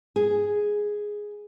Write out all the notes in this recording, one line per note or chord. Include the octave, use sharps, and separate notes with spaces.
G#4